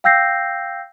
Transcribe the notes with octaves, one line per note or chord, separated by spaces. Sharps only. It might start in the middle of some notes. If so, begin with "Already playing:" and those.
F5 G5 E6 G6 A#6 C7